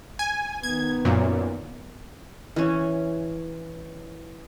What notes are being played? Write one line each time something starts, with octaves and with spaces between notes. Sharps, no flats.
G#5
D#3 B3 G#6
F#2 A#2
E3 C#4